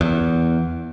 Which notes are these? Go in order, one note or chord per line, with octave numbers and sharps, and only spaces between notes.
E2